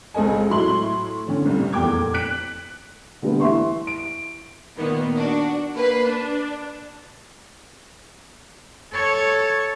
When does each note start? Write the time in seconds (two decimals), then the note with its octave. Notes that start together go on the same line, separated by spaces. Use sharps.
0.14 C#2 C4 A4 D#5 G#5
0.50 A2 F#3 A3 E4 C6 F#7
1.26 A2 D3 C#4
1.46 C2 G3
1.73 F1 E2 A#2 G5 D6 G#6
2.14 F#6 B6 D7
3.22 D3 G3 A3 B3
3.40 E3 E5 C6 C#6
3.87 D7
4.75 A#2 D#3 A#3 B3
5.15 D4 F#4
5.74 A#3 B4 C7
6.03 D4
8.93 A4 C#5